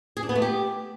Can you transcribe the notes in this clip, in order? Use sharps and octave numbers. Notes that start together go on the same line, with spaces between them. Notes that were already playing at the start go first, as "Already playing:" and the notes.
G#4
D4
B3
A3
G4